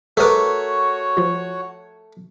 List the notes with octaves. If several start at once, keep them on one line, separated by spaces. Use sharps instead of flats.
A3 F#4 G#4 A#4 B4 C#5 D6
F3 F4